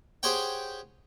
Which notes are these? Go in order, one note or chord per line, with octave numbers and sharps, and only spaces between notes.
G4 G#4 C5 C#5 F#5 G5